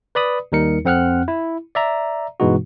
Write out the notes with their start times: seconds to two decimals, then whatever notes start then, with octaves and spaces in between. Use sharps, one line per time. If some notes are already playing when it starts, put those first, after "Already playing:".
0.15 B4 D5 B5 D#6
0.52 D#2 G3 D#4 A#4 C#7
0.85 F2 C4 F#5 F6 F#6
1.28 E4
1.75 D5 E5 A#5
2.40 G2 B2 E3 G#3 D#4 F#4